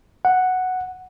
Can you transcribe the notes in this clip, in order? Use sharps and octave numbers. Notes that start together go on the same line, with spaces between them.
F#5